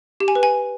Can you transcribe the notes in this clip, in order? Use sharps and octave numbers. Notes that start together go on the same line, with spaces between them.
G4
G#5
B4
G#5